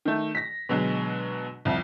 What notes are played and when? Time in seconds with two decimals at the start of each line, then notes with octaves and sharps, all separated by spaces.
0.05 D#3 A3
0.35 A#6 B6
0.69 B2 D3 F#3 G#3
1.65 C2 F2